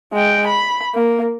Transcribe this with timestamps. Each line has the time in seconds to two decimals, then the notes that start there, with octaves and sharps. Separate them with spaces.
0.13 G#3 G5
0.47 B5
0.95 A#3